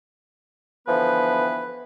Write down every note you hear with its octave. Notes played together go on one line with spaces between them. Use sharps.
D3 E3 F3 B3 B4